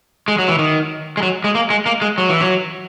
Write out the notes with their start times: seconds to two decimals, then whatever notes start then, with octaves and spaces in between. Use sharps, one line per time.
0.28 G#3
0.39 F#3
0.49 E3
0.59 D#3
1.17 G#3
1.23 F#3
1.44 G#3
1.55 A#3
1.70 G#3
1.86 A#3
2.02 G#3
2.18 F#3
2.29 E3
2.41 F#3